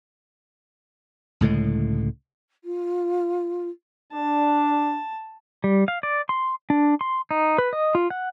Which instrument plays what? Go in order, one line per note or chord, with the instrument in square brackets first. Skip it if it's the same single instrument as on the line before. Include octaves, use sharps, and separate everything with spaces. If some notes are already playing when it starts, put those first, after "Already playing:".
[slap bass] C#2 A2 D3 G#3
[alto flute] F4
[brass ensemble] D4 [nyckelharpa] A5
[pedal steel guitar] G3
F5
D5
C6
D4
C6
D#4
B4
D#5
F4
F#5